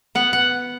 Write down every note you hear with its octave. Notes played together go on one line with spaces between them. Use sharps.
B3 F#5
F#5